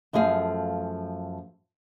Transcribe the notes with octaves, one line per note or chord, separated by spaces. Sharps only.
F#2 F3 A3 G#4 F5